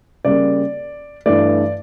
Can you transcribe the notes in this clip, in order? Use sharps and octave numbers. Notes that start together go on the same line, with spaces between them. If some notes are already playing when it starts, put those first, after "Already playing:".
C#3 G3 A#3 D5
G2 E3 A3 D5